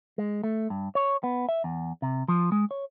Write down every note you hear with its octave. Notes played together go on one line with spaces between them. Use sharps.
G#3
A3
G2
C#5
B3
E5
E2
C3
F3
G#3
C#5